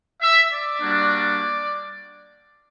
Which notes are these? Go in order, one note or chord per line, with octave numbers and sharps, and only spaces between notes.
E5
D5
G3 A#3 D4 F#4